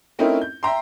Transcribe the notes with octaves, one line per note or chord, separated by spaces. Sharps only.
A3 C4 C#4 D#4 E4 A#4
G6
E5 G5 A#5 C6